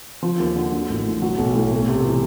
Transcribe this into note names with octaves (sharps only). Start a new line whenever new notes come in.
F3
D#2
D3
F#3
A1
A2
F#3
B1
A2
A3
C3
E3